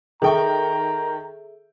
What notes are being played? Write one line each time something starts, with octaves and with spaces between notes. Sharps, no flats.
D#3 G#4 A4 E5 G5 A#5 C#6